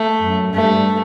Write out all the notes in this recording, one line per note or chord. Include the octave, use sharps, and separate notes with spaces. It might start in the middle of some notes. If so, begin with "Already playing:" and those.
Already playing: A3
F#2
G2 A3